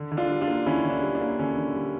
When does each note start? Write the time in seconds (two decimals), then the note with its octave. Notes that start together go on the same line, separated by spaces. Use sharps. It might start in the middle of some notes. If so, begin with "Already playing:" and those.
Already playing: D3
0.12 D3
0.17 D4 F4
0.30 G3
0.41 D4 F4
0.48 A#3
0.66 D3 C#4 E4
0.84 D3
0.90 D4
1.02 G3
1.15 D4
1.21 A#3
1.39 D3 C#4
1.57 D3
1.75 G3